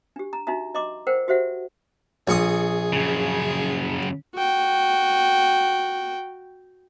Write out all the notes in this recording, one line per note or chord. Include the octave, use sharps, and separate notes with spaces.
D4 G4
A#5
D4 D#4 F#4 E5 A#5
D#5 A#5 C6 D6
A#4 C5 F#5 G5
F#4 G4 C5 E5 F#5
A#1 G#4 C#6 D#6
F#2 C#3
F#4 G5